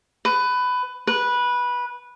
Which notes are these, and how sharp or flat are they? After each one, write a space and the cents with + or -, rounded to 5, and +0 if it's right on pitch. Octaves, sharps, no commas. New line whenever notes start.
B4 +15
B4 -15